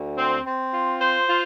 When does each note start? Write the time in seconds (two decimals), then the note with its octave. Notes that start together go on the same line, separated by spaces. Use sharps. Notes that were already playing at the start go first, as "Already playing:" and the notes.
Already playing: D2
0.17 C4
0.45 C4
0.74 F4
1.00 C5
1.28 F4